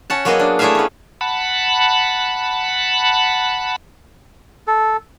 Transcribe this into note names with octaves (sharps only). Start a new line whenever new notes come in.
C#4 F#5 A5
F#3 A#3 B3 F#4 G#4 D#5
D4
A3 D4 E4 G#4 E5 F5
B3 C#4
F#5 A5 B5
A4